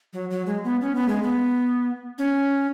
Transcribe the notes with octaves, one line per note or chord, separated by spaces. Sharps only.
F#3
F#3
G#3
B3
C#4
B3
G#3
B3
C#4